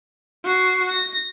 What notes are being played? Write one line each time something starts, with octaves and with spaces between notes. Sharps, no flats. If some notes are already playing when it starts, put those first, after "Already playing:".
F#4 C7
A#6